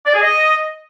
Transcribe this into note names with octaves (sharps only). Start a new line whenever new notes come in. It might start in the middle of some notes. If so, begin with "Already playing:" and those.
D5
G#4
D#5